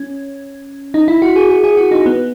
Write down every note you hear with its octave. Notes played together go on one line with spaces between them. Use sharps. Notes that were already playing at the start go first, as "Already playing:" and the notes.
Already playing: C#4
D#4
E4
F#4
G#4
G#4
G#4
F#4
D#4
B3